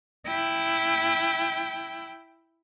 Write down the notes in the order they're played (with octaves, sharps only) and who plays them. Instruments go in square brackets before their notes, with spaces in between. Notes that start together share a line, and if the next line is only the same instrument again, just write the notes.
[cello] E4 G5